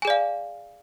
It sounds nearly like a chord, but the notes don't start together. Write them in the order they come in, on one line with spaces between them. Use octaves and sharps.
G#5 G#4 D5 F5